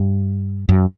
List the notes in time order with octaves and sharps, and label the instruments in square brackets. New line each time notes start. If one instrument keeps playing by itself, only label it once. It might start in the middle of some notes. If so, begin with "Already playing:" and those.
Already playing: [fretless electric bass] G2
F#2